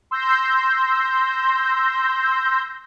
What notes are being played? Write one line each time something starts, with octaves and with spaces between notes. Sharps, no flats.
C6 E6 G6 A#6